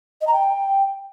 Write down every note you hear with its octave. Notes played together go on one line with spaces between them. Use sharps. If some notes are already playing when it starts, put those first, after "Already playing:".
D#5
A#5
G5